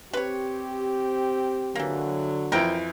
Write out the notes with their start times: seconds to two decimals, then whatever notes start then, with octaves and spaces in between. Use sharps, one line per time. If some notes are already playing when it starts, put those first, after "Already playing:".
0.13 C4 G4 B4 C#5
1.75 D3 E3 F#3 A#3
2.52 F2 E3 A#4 G5